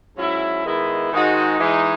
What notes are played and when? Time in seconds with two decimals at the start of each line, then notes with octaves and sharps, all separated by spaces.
0.16 G#2 F#3 C#4 E4
0.65 D#3 G#3 B3 E4
1.12 G#2 D#3 G#3 D#4 F#4
1.59 E3 G#3 D#4